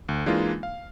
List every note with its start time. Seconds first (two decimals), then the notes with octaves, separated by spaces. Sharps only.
0.09 D2
0.26 E3 G#3 A#3 D4 D#4 F4
0.63 F5